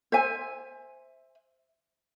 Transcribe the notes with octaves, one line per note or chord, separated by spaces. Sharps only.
C5 E5 G#5